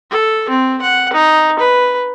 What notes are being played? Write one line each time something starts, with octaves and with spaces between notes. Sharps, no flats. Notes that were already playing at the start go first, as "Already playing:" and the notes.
A4
C4
F#5
D#4
B4